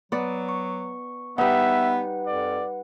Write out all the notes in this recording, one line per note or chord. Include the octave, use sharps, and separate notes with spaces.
F#3 B3 D5
C#6
G3 B3 D#4 B4 E5 F#5
F2 D5